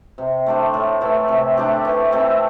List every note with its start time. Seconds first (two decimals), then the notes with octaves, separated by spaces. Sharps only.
0.18 C3
0.46 A3 D4 C5
0.74 A2
1.01 E3 A3 E4
1.28 C3
1.57 A3 D4 G4
1.85 E3
2.12 A3 C4 E4